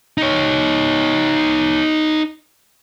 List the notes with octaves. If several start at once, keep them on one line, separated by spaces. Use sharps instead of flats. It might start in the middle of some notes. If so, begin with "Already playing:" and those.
D#4 C#5